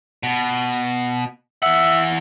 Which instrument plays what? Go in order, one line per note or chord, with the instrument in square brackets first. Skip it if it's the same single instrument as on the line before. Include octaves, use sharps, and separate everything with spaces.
[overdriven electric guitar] B2
[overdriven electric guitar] E3 F#5 [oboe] E5